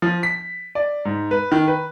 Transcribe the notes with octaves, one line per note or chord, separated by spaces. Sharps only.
F3
B6
D5
G#2
B4
D#3
B4